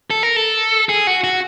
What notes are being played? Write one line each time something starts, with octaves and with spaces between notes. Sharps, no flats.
A4
A#4
A4
G#4
F#4
F#4